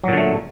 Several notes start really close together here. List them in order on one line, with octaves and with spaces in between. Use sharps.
F#3 A#2 D3 A3